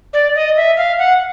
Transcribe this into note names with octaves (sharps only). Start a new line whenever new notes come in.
D5
D#5
E5
F5
F#5